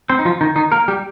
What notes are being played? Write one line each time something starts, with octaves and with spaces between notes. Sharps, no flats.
C4 C5
D#4
F3 F4
D#3 D#4
D#3 D#4
A#3 A#4
G3 G4